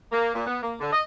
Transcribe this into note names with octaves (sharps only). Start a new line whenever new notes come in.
A#3
A#2
B3
A#3
D3
D#5